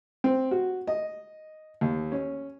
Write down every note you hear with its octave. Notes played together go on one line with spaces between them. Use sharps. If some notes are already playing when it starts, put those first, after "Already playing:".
C4
F#4
D#5
D#2
C#4